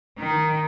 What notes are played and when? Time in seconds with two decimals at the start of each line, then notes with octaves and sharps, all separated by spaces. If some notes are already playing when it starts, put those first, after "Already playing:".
0.18 D#3